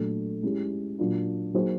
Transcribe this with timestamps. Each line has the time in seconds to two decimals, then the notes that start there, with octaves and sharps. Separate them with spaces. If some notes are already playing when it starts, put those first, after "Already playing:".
Already playing: A#2 F#3 A3 D4
0.43 G#3 C#4 E4 G4
0.98 A#2 F#3 A#3 D4 F4
1.54 F#3 A#3 D#4 G#4 C5